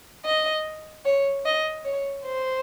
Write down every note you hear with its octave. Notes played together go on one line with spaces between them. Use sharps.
D#5
C#5
D#5
C#5
C5